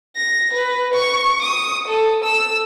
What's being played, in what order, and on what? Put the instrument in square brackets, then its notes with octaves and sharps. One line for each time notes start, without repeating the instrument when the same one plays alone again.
[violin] A#6
B4
C#6
D#6
A4
E6